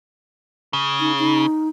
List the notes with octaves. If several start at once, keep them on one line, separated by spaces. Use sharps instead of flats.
C#3
D#4
D#4